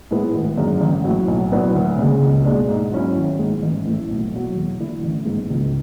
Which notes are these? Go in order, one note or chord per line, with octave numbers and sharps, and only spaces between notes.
A2 G#3 B3 E4
G#1
F#2 D3 G#3
A1
A2 F#3
B1
A2 F#3 B3 D4
D2
C#3 G#3
C#2
B2 G#3 D4
G#2
F#3 C#4 E4
G#1
G#2 G#3
A1
A2 E3 A3
B1
B2 F#3
E2
D3 A3 E4
A1
G#2 E3 G#3 B3
C#2